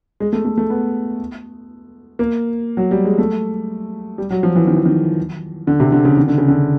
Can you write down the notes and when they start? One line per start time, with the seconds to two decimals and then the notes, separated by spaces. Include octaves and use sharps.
0.20 G#3
0.33 A3
0.45 A3
0.58 A3
0.70 B3
2.19 A#3
2.77 F#3
2.91 G3
3.05 G#3
3.18 A3
4.18 G3
4.30 F#3
4.43 F3
4.56 E3
4.67 D#3
4.76 E3
4.86 D#3
5.67 D3
5.80 C3
5.92 D3
6.05 C#3
6.17 D#3
6.28 D3
6.38 C#3
6.48 D3